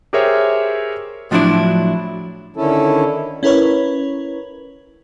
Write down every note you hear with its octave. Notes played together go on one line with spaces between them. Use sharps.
G4 G#4 A#4 C5 C#5 E5
A2 F3 F#3 D4 E4 D5
D3 D#3 C#4 E4 A4
C#4 E4 A#4 B4 C#5